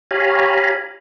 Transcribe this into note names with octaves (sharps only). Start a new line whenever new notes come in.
G4 C#5 F5 G#5 A#5 B5